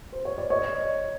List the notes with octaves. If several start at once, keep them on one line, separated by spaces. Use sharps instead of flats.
C5
C#5
D5
C#5 D#5